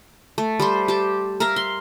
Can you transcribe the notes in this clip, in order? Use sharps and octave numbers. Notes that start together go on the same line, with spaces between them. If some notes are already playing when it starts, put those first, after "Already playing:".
A3
G3 A3 C5
G4 A5
A#4 E5 F5 A#5
C6